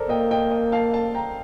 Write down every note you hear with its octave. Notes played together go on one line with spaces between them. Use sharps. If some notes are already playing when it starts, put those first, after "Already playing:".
Already playing: A4 A#4 C5 D5
A#3 D#5 G5
D#5 G5
D#5 G5
F5 A5
F5 A5
G5 A#5